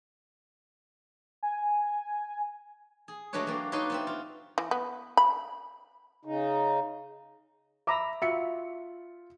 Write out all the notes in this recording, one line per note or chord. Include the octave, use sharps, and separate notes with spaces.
G#5
G#4
F#3 G#3 A3 D4 B4 C#5
F#3 A#3 G4 D5
D4 D#4 B4 C#5 D5 C6
B3 C4 E5
F4
E3
B3
B5
C#3 D#4
E5 A#5 B5 D6 E6
F4 F#4 E5 B5 C#7